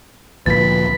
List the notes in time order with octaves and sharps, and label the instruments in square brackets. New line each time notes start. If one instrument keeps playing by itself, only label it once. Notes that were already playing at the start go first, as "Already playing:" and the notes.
[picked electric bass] D2 A#2 F3 [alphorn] B4 [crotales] A6 B6